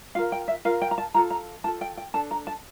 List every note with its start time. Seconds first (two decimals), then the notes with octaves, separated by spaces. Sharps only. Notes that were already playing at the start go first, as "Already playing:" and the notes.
0.15 F4 A#4 F5
0.32 G5
0.48 E5
0.65 F4 A#4 F5
0.82 G5
0.91 A#5
0.98 A5
1.14 F4 A4 A#5
1.30 A#5
1.64 F4 A4 A5
1.81 G5
1.97 G5
2.14 D4 A4 A5
2.31 A#5
2.47 A5